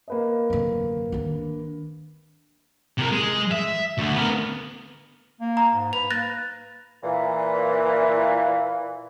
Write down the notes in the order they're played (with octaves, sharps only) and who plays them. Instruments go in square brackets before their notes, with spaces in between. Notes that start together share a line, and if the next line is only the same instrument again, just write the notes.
[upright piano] A#3 B4 D#5
[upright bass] F#2 D3
D#3 D4
[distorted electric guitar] C3 A#4
G#3
E5
D2
B3 A#4
[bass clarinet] A#3
[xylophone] A#5
[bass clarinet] G#2
[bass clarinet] B4 [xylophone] F7
[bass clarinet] A#3 [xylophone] F#6 A6 A#6
[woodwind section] A#2 E3